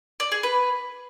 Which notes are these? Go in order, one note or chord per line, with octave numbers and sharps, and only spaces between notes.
D5
G#4
B4